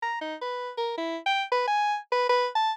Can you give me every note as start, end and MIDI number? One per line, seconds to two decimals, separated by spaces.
0.02 0.20 82
0.21 0.35 63
0.41 0.71 71
0.77 0.93 70
0.97 1.17 64
1.26 1.43 79
1.52 1.66 71
1.68 1.96 80
2.12 2.27 71
2.29 2.47 71
2.55 2.72 81